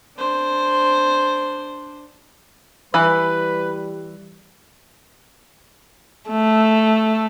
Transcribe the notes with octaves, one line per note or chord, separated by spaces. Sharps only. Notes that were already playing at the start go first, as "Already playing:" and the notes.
D4 C5
E3 G3 B4 B5 F#6
A3